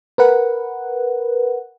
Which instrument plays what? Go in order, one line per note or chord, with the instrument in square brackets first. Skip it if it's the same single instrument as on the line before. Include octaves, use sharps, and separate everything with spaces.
[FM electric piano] A#4 B4 F#5